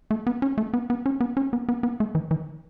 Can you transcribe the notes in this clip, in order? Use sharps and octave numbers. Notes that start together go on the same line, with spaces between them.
A3
B3
C#4
A3
B3
B3
C#4
B3
C#4
B3
B3
B3
A3
E3
E3